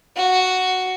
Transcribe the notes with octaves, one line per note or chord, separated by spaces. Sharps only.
F#4